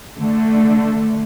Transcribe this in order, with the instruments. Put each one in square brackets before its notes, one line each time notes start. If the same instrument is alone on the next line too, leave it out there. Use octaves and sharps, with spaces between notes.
[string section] D3 A3